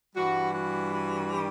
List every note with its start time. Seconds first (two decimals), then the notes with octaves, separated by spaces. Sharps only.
0.15 G2 E3 G3 F#4
0.54 F#4
0.94 F#4
1.33 G4